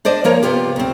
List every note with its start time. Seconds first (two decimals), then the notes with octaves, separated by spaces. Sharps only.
0.05 D4 C5 D5 D#5
0.24 F3 A#3 A#4 C#5
0.43 C3 A#3 B3 F4 G4
0.76 D2 C4